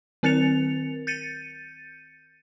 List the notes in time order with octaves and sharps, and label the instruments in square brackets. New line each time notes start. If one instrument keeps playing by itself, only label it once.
[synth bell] D#3 C4 A#4 A6 C#7 F7
G6 A6 C#7 D#7